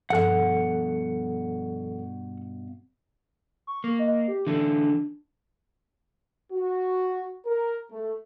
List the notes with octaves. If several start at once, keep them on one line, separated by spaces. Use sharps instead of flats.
G2 B2 F3 A4 F#5 F#6
C#6
A#3
D#5
G4
D3 E3 A3 D4
F#4
A#4
A3